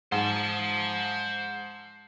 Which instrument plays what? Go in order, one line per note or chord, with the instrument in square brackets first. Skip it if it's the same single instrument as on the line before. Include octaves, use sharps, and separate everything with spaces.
[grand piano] G#2 [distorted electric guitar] C5 A5